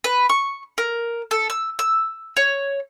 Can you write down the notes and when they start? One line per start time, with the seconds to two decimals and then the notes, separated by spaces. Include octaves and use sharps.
0.04 B4
0.29 C#6
0.78 A#4
1.31 A4
1.50 E6
1.79 E6
2.37 C#5